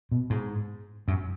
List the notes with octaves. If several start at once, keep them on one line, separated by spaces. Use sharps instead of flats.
B2
G#2
F#2